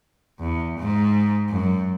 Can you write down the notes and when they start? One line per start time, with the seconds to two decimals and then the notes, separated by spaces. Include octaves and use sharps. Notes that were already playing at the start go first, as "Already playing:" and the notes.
0.40 E2
0.78 G#2
1.50 F#2